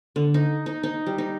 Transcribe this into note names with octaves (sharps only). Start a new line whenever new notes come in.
D3
D#4
D#4
D#4
G3
D#4